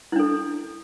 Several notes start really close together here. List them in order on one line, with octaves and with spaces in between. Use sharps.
E4 D4 A4